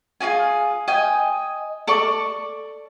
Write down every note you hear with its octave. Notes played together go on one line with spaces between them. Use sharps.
F4 F#4 G#4 G#5
D#5 G5 G#5
A4 D5 C#6